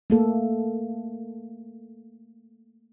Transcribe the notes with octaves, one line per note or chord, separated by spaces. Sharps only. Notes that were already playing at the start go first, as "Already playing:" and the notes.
A3 A#3 A4